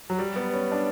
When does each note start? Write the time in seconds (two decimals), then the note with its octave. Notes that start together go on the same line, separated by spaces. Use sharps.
0.10 F#3
0.19 G3
0.36 B3
0.53 C#4
0.72 D4